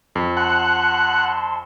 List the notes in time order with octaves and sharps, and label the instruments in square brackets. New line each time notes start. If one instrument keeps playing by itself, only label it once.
[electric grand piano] F2
[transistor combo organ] F#5 [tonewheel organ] A5 C6